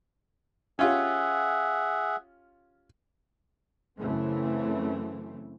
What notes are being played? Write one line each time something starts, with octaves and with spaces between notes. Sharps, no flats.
C#4 F4 G4 G#4 E5 F#5
F#2 C#3 E3 A3 C4